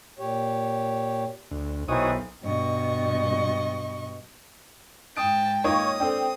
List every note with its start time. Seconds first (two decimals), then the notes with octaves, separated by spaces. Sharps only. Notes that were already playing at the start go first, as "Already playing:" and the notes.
0.19 A#2 G4 C#5
1.51 D2
1.88 B1 D#3 E3 F#4 C5 C#5 D#6
2.43 G2 B2 D#5 C#6
5.17 G#2 G5 A5 D#6 D7
5.64 A#3 D#4 F4 C#5 D#6
6.00 C4 D4 A4 G5